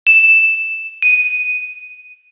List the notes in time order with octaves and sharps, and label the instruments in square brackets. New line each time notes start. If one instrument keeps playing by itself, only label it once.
[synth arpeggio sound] E7
D#7